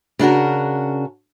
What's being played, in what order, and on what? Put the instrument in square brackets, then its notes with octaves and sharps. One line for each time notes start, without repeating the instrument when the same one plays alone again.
[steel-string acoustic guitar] C#3 D4 F#4 A#4